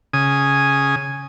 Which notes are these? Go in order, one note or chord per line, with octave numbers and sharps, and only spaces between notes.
C#3 G#5 D#6